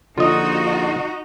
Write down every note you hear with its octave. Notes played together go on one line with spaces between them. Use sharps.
A#1 D3 D#4 F4 F#4 D#5